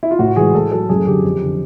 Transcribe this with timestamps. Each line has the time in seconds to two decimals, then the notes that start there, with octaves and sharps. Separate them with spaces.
0.03 E4
0.11 F4
0.19 A2 F#4
0.36 E3 G#3 G#4
0.54 A2 A4
0.72 F#3 A4
0.89 F#2 G#4
1.07 D3 F#3 G4
1.24 F2
1.41 D3 F3